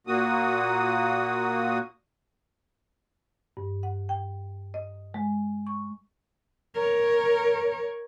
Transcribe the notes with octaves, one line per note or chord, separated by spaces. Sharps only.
A#2 A#3 F#4 D#6
G2
F#5
G5
D#5
G#3
C#6
A#4 C#5